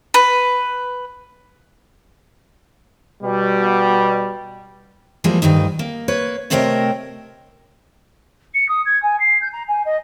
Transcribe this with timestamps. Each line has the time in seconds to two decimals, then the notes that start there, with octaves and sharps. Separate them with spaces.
0.14 B4
3.22 B2 G3
5.24 E3 F3 G3 G#3 A#3
5.42 D2 G2 D#3 D#4
5.79 A#3
6.08 A#3 B4 C#5
6.50 C3 A3 C4 A#4 C#5 D#5
8.54 C#7
8.68 D#6
8.85 G#6
9.02 G#5
9.19 C7
9.41 G6
9.52 A#5
9.68 G#5
9.85 D#5